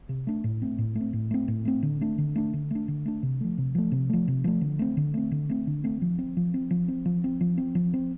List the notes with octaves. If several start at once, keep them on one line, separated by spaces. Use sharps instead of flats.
C3
A3 D4
A2
A3 C4
A2
A3
C4
A2
A3 C4
A2
A3 C4
D3
A3 D4
D3
A3 D4
D3
A3 D4
D3
A3 D4
C3
F3 A3
C3
F3 A3
C3
F3 A3
C3
F3 A3
D3
A3 C4
D3
A3 C4
D3
A3 C4
D3
A3 C4
F3
C4
F3
C4
F3
C4
F3
C4
F3
C4
F3
C4